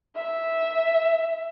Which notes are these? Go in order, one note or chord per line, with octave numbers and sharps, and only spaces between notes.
E5